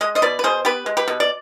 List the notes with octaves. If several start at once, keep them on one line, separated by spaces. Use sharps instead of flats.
G#3 D#5
C5 D#5
B2 B4 D5
B4
B2 G#4 C5
B3 G4 B4
G#3
G4 B4
B2
D5